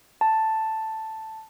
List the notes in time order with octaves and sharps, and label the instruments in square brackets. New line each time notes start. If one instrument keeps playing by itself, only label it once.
[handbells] A5